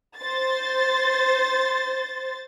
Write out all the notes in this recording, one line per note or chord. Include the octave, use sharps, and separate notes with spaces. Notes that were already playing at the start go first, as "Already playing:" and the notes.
C5 A6